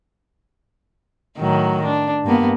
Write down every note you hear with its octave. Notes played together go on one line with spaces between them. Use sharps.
A2 D#3 F#3
D4
G2 A#3 B3